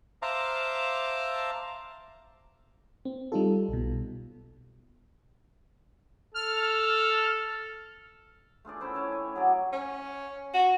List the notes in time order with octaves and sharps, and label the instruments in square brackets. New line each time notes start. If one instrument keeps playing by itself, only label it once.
[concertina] C5 E5 F5 A5 A#5 D6
[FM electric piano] C4
G3 D#4 F4 A4
B1 B2
[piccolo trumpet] A4 [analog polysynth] F6
[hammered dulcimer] A3 F4 G#4 D5
C#4 E4 C5 G5
C#4 C#5 G5 A5
G#5
F#3 G#4 D5
[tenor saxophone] C#4
F#4